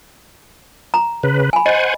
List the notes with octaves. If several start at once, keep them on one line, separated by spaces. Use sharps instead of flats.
A#5
C#3 B4
G#5 B5
C5 D#5 F#5 G#5